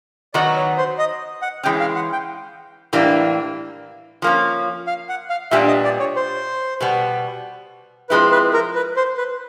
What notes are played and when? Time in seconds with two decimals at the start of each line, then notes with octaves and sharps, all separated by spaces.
0.34 D#3 F#3 B3 D#4 F#4 D5
0.55 C#5
0.78 C5
0.98 D#5
1.42 F#5
1.63 E3 G#3 C#4 G5
1.80 F5
1.95 F#5
2.12 G5
2.93 A2 E3 G3 A#3 D4
4.22 F3 A#3 C#4
4.87 F5
5.09 F#5
5.30 F5
5.51 A#2 G3 B3 D4 E5
5.67 D#5
5.84 D5
6.00 C#5
6.16 C5
6.80 B2 G3 B3
8.09 F3 G#3 C4 E4 B4
8.31 B4
8.53 A#4
8.75 B4
8.96 C5
9.17 B4